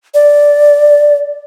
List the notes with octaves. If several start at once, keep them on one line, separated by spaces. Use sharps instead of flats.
D5